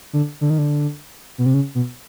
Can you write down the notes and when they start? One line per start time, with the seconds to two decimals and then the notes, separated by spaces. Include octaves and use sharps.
0.13 D3
0.41 D3
0.50 D#3
0.58 D3
1.38 B2
1.46 C3
1.54 C#3
1.75 B2